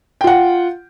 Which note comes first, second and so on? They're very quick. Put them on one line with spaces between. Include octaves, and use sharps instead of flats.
G5 F4 F#5